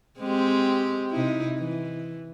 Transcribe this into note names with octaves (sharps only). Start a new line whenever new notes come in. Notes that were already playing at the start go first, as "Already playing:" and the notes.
G#3 C4 G4
C3 D#4 E4
E3